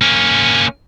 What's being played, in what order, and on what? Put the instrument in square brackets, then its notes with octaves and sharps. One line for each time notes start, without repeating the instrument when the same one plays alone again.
[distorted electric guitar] A#3 C#4